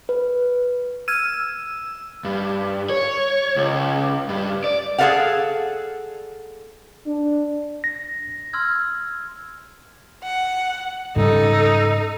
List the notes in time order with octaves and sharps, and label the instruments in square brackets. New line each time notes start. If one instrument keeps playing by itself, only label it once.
[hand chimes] B4
[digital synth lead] E6 [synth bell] F6 G#6 D#7
[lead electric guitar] G2
C#5
C#2
G2
D5
[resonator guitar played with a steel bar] G#4 A4 B4 D5 F5 F#5
[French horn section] D4
[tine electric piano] A#6
[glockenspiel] C6 E6 F6 G#6
[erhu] F#5
[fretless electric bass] G#2 C#3 G3 [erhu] D#4 [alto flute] A4